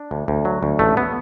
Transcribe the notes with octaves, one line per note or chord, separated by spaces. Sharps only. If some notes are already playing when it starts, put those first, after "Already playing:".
Already playing: D4
D2
D2
F#3
D2
A1 A3
B3